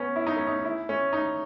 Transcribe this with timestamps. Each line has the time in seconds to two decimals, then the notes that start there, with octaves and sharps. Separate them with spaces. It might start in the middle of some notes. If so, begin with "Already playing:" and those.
Already playing: B3 C#4
0.16 E4
0.27 D#4
0.37 C#4
0.47 D#4
0.65 E4
0.89 C#4
1.13 D#4